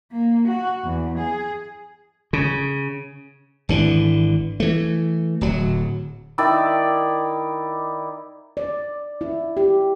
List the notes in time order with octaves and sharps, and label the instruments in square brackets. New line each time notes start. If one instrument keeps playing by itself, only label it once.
[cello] A#3
F#4
E2
G#4
[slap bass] C#3
G#1 D3 E3
E3 A3
D1 F#3
[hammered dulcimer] D#3 E4 D5
[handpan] D5
E4
G4